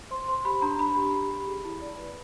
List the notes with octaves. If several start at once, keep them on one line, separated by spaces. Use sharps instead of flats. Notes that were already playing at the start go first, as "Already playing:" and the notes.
C5 C6
C5 C6
G4 B5
D4 A#5
D4 B5
G4
G4
G4
G#4
E4
D5
B4